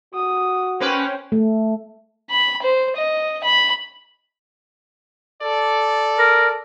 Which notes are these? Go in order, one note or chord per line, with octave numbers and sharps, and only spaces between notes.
F#4 D#6
A#3 C#4 B4 C5 G5
A3
B5
C5
D#5
B5
A4 D5
A#4